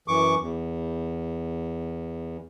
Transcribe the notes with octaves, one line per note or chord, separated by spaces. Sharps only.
F#2 E3 C#6 D6
E2